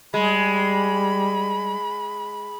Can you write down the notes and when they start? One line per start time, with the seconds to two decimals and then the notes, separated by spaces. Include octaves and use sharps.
0.14 G3 G#3 B5